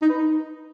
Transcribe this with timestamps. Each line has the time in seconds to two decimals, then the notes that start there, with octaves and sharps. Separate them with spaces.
0.02 D#4
0.09 B4
0.17 D#4